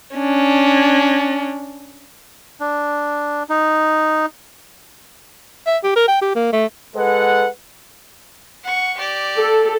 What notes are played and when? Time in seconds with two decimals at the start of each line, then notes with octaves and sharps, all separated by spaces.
0.17 C#4 D4
2.60 D4
3.49 D#4
5.66 E5
5.84 G4
5.96 A#4
6.08 G5
6.21 G4
6.36 A#3
6.53 A3
6.96 G#3 A4 B4 F#5
8.63 F#5 C#6
8.97 G4 D5
9.38 A4